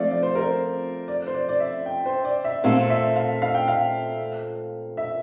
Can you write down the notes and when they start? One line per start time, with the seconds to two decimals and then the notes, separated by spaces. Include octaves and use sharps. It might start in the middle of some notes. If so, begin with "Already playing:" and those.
Already playing: F3 A3 C4 F4 D5
0.11 D5
0.23 C5
0.35 A#4
0.47 C5
1.08 D5
1.27 C5
1.34 D5
1.49 D5
1.60 E5
1.86 G5
2.06 C5
2.25 D5
2.45 E5
2.64 A#2 A3 C4 F4 A4 F5
2.90 E5
3.16 F5
3.42 F5
3.54 G5
3.68 F5
4.97 E5